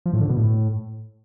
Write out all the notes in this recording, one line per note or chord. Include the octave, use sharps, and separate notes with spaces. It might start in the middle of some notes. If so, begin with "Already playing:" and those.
F3
A2
D3
B2
A2